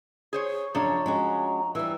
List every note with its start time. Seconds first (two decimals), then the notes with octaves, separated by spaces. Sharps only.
0.33 G#4 C5 C#5
0.75 F#2 C#3 F3 D4 C#5 A#5
1.06 G#3 C#4 F#4
1.75 E3 G3 E6